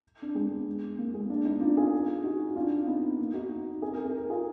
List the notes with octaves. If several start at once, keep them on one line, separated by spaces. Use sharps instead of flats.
D4
G#3 B3
A#3
G#3 B3
A#3 D4
B3 D#4
D4 F4
F4 G#4
D#4 F#4
F#4
D4 F4
B3 D#4
A#3
D#4 F#4
G#4
A#4
G#4
A#4
F4 G#4